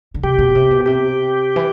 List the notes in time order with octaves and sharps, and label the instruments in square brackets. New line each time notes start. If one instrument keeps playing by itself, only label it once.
[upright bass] D3
[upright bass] C3 [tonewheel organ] G4
[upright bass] B2
C3
B2
[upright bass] C3 [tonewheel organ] G4
[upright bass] E3